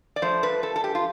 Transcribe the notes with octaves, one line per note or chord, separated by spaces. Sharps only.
D5
G2 F3 A3 C5
B4
A4
A4
G4
F4